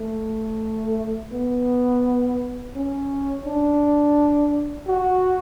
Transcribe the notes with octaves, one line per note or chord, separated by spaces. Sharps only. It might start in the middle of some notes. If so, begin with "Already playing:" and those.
Already playing: A3
B3
C#4
D4
F#4